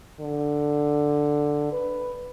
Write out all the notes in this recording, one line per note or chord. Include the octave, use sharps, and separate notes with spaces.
D3
B4